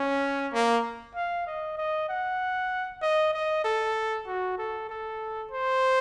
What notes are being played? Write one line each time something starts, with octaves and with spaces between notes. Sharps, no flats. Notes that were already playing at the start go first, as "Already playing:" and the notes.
Already playing: C#4
A#3
F5
D#5
D#5
F#5
D#5
D#5
A4
F#4
A4
A4
C5